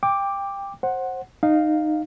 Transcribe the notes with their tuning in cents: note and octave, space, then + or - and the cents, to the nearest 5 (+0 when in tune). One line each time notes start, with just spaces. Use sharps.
G5 +20 D6 +0
C5 +20 F#5 +0
D#4 -15 F5 +5